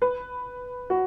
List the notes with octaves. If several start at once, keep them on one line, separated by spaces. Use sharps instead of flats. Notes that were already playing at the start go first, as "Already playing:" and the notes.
B4
F#4